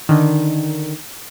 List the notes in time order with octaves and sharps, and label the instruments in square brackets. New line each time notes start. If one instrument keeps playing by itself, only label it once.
[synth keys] D3 D#3